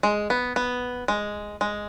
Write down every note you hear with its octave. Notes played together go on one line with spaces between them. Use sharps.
G#3
B3
B3
G#3
G#3